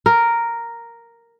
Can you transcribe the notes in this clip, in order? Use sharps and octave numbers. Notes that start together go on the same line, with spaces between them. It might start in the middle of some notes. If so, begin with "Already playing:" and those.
A#4